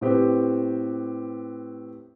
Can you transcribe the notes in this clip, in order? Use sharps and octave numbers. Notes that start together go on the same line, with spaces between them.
A2 B3 C4 G4